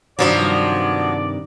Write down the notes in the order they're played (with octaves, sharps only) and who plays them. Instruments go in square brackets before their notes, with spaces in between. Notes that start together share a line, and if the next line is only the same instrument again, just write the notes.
[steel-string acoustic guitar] G2 C3 D#3 [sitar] F3 F#3 B3 [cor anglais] D5